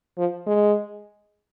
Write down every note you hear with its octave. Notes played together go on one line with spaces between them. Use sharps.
F3
G#3